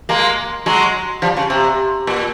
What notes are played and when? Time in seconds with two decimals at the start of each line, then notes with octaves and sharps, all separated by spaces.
0.09 G#3 A#3
0.66 F#3 G#3
1.22 F3 G3
1.37 C#3
1.50 C3
2.07 A#2